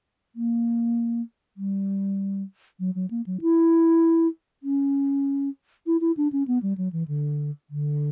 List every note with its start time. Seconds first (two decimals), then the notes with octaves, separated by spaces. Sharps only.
0.36 A#3
1.57 G3
2.80 F#3
2.95 F#3
3.11 A#3
3.26 F#3
3.41 E4
4.63 C#4
5.87 E4
6.01 E4
6.17 D4
6.33 C#4
6.48 B3
6.63 G3
6.78 F#3
6.93 E3
7.08 D3
7.70 D3